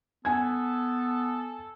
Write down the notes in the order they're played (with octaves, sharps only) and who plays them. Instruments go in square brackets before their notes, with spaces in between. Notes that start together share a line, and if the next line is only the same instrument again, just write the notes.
[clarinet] B3 [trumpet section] A4 [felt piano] G#5 G#6